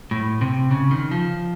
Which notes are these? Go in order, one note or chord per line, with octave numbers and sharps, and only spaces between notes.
A2
C3
C#3
D#3
F3